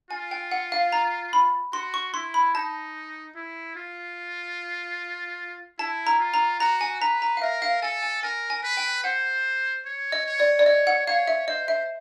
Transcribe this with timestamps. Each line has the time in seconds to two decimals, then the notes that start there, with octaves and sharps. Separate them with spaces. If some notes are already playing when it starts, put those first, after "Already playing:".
0.11 F4 G#5
0.31 G5
0.51 F#5
0.72 F5
0.92 A#5
1.33 B5
1.73 F#4 C6
1.94 C#6
2.14 E4 C6
2.34 B5
2.54 D#4 A5
3.36 E4
3.76 F4
5.79 E4 A5
6.07 A#5
6.20 F4
6.34 A#5
6.60 F#4 A#5
6.81 G#5
7.01 B4 A#5
7.22 A#5
7.37 F5
7.42 A#4 E5
7.62 F5
7.82 A4 G#5
8.03 G#5
8.23 A#4 G#5
8.50 G#5
8.64 B4
8.77 G5
9.04 C5 F#5
9.86 C#5
10.12 D#5
10.26 C#5
10.40 D5
10.59 D5
10.66 C#5 D#5
10.87 F#5
11.07 C#5 F5
11.28 E5
11.48 C5 D#5
11.68 E5